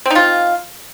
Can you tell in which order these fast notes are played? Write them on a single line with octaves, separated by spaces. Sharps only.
C4 D#4 F4